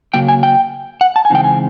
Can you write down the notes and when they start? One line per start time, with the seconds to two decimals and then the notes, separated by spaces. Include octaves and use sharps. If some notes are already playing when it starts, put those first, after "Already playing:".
0.14 C#3 F#3 A#3 G5
0.28 G#5
0.43 G5
1.01 F#5
1.16 A5
1.25 G#5
1.30 C#3 E3 G#3 C4 D#4 G5
1.44 G#5